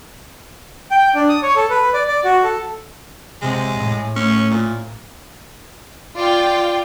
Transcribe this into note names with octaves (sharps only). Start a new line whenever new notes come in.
G5
D4
D#6
C#5
A4
B4
D5
D5
F#4
A4
C3 G#3
A2
A3 C#4
A#2
F4 D5 G5